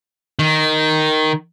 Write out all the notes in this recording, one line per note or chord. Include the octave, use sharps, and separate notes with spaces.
D#3